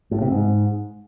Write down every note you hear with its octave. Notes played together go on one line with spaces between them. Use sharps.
A2
C3
G#2